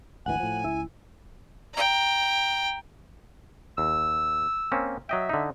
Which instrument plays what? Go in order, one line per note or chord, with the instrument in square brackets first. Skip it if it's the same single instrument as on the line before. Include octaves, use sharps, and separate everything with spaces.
[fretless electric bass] G#1 D2 E3 [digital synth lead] F#5 [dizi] G#5
[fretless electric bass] A2 F3
[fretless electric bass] C#2 [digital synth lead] E4
[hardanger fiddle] G5 A#5
[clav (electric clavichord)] D#2 [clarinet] E6
[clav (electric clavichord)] A#3 C4 C#4
[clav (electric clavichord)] F#3 D#5 G5 [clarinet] E5
[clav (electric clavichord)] D3 D#4